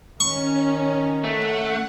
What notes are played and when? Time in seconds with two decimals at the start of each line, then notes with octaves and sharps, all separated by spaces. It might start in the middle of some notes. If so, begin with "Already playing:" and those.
0.20 D#3 C#4 C#6
1.24 A3 F#5